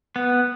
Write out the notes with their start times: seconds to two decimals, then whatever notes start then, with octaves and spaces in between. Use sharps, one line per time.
0.16 B3